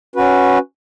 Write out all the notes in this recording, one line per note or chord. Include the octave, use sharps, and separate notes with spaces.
C#4 F#4 B4